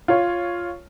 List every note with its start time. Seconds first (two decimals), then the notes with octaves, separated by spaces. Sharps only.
0.08 F4 C#5